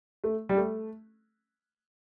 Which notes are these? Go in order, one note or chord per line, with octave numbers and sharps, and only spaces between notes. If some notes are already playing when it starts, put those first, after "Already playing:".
A3
G3
A3